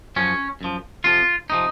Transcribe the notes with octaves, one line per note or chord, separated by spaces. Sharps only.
F#2 F3 C#4
F#2 F3
F2 C3 F3 F4
C3 F3 D#4